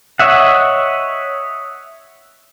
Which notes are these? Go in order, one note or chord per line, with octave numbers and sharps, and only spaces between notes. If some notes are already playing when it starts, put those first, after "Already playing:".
C#5 D#5 E5 F#5